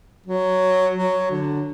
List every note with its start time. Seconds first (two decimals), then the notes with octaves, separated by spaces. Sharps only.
0.26 F#3
0.96 F#3
1.31 D3